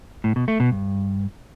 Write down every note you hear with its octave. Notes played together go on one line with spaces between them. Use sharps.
A2
B2
A3
B2
G2